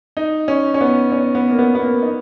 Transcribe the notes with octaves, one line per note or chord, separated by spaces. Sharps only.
D#4
C#4
C#4
B3
C#4
B3
A#3
B3
B3
A#3
D#4